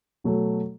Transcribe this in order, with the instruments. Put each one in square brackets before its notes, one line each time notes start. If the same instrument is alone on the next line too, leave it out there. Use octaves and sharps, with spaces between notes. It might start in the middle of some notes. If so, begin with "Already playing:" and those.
[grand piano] B2 F#3 A3